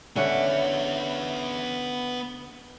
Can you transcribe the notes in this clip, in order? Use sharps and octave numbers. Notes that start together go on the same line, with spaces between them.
D3 B3 C#4 E5 F#5